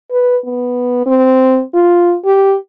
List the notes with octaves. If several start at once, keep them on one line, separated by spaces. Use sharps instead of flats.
B4
B3
C4
F4
G4